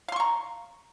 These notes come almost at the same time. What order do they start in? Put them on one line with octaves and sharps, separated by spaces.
F5 C6 C#6 A#5